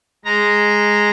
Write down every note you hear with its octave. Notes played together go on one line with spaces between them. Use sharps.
G#3 A#5